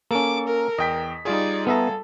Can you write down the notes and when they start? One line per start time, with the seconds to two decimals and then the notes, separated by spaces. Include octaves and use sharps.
0.11 A#3 C#4 A4 D6
0.48 A#4
0.78 E2 D#5 G5 B6
1.25 G3 D#4 F4 G#4 D5
1.67 B3 A4 E5 A#5